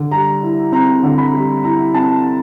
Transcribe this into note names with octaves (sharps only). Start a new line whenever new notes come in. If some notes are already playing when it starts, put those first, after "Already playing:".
Already playing: D3
G3 A#5
E4
C4 A#5
D3
B5
G3
E4 A#5
C4 A5